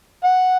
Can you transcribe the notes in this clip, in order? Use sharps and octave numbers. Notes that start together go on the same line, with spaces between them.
F#5